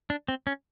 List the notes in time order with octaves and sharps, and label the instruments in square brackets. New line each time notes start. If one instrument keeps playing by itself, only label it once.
[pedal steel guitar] D4
C4
C#4